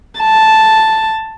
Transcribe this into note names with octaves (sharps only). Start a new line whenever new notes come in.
A5